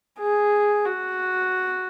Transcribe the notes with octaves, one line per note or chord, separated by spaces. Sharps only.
G#4
F#4